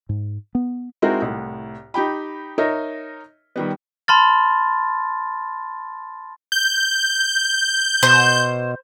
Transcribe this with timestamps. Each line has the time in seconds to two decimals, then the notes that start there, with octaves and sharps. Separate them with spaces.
0.09 G#2
0.55 B3
1.02 G#3 C4 D#4 E4 F#4 A#4
1.22 C2 A2
1.94 D#4 G4 G5 B5
2.58 D#4 A#4 C#5 D#5 E5
3.56 D#3 G3 B3
4.08 A5 B5 C6 F6 A6
6.52 G6
8.03 B2 C5